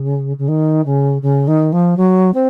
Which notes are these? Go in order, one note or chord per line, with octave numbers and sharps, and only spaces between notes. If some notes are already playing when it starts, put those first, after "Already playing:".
Already playing: C#3
C#3
D#3
C#3
C#3
D#3
F3
F#3
C4